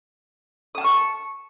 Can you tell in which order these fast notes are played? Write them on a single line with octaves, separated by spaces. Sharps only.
D#6 A5 F6 C#6